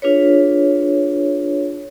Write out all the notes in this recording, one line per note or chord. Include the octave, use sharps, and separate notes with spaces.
D4 F4 G#4 B4 C#5